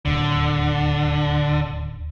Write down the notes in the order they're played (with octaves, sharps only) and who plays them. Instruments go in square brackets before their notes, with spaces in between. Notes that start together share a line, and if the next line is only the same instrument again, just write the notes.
[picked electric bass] D1 D#2 [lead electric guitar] D3